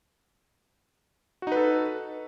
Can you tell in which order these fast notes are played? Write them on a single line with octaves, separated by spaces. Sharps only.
F#4 D#4 B4 A4